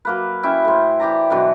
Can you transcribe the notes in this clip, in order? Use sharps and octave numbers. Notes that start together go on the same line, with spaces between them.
F#3 A#3 B4
C#4 E4 E5 G5
A2 C5
E3 G4 D5 A#5
B2 D3 E3 F#3